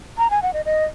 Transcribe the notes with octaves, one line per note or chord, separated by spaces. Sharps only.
A#5
G#5
F#5
D#5
D#5